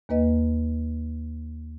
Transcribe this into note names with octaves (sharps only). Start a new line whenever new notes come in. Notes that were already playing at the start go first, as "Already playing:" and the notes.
D#2 A#3 B4 D#5